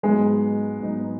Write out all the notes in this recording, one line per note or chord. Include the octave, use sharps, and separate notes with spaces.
G#2 F#3 G#3 B3 D#4
G#2 F#3 B3 D#4